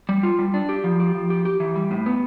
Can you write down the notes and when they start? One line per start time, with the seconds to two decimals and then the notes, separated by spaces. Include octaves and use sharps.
0.09 G3
0.23 F4
0.39 G3
0.54 D4
0.69 G4
0.84 F3
1.00 G4
1.15 F3
1.30 G4
1.45 G4
1.60 E3
1.76 G3
1.91 A2
2.06 B3